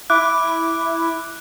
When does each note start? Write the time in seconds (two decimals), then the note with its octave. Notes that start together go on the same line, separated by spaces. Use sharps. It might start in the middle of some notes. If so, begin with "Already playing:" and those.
0.10 E4 D6 F#6